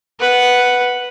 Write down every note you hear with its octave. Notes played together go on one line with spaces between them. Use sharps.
B4 F#5